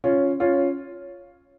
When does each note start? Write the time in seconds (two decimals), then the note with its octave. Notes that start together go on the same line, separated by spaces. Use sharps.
0.04 C#4 F4
0.40 C#4 F4